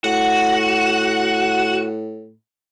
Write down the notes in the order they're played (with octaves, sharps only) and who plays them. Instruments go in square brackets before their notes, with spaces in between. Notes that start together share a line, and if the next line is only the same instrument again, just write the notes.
[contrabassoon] A2 [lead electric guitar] F#4 [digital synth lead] F#5